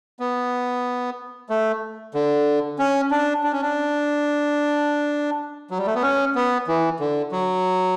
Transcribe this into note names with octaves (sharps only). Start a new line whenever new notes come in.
B3
A3
D3
C#4
D4
D4
C#4
D4
F#3
G3
A3
B3
C#4
B3
E3
D3
F#3